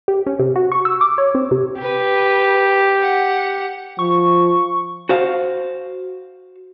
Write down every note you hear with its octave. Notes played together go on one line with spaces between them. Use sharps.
G4
C#4
C3
F#4
C#6
E6
D6
C#5
C4
C3
G4 B4
F#5
F3 C#6
F#4 C5 F5